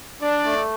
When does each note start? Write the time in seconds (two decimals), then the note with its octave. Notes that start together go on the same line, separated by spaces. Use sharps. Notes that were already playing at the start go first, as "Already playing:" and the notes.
0.21 D4 D5
0.44 A3